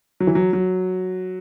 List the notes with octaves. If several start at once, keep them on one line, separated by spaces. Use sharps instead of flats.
F#3
E3
F#3
F#3